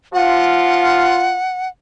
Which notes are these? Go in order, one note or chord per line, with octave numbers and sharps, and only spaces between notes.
F3 F4 F#5